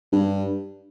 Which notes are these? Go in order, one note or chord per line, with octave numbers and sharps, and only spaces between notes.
G2